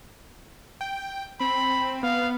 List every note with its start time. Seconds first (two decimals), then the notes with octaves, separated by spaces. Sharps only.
0.81 G5
1.40 C4 B5
2.03 B3 F5